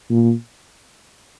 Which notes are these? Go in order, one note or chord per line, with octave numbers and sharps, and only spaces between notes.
A#2